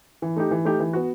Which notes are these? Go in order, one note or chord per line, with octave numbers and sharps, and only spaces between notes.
E3
A3 D#4 G4
E3
A3 D#4 G4
E3
B3 F#4